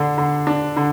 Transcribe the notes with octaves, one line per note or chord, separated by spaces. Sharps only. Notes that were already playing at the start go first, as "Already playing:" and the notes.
Already playing: D3 D4
D3
D4
D3